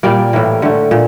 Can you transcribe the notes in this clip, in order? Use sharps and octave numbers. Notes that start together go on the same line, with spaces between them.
A#2 G3 A#3 D5
A2 E3 A#3
D3 A3
A#2